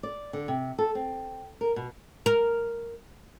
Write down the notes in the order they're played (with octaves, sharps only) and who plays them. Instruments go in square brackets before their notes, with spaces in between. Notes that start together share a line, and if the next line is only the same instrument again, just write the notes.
[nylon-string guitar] D5
D3
C3
A4
C4
A#4
B2
[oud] A#4